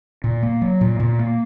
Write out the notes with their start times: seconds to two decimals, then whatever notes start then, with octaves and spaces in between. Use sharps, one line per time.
0.24 A#2
0.43 A#3
0.62 F#3
0.81 A#2
1.00 A#2
1.19 A#3